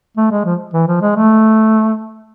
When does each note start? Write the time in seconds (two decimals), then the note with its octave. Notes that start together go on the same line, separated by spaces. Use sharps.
0.17 A3
0.31 G#3
0.45 F3
0.74 E3
0.88 F3
1.02 G#3
1.16 A3